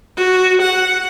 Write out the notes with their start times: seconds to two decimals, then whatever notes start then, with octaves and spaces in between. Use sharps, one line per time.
0.17 F#4
0.62 F#5